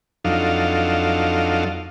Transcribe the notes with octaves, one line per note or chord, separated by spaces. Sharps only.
F2 F#3 D4 D#4 A4 F5